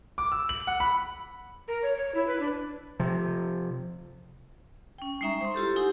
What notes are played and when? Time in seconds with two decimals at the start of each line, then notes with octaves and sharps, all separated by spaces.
0.18 D6
0.32 E6
0.49 F#7
0.67 F#5
0.80 B5
1.68 A#4
1.83 C#5
1.97 C#5
2.15 E4
2.27 B4
2.40 D4
3.00 C3 F3
4.98 C#4 G5
5.21 G3 G#3 D#4 E5 A#5 C#6
5.41 C5 C6
5.54 E4 F4 G4 A4
5.76 D#4 G4 F#5 G#5